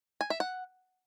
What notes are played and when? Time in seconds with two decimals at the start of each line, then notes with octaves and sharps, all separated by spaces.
0.21 G#5
0.30 E5
0.40 F#5